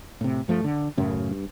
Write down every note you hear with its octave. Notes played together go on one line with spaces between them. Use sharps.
A2 C3
G2 F3 A3
D3
F#2 A2 C#3
G2